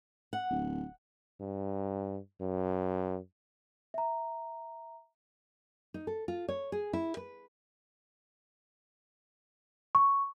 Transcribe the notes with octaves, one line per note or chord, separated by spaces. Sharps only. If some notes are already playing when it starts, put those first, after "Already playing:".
F#5
D1
G2
F#2
E5 A#5
D#4
A4
F4
C#5
G#4
E4
B4
C#6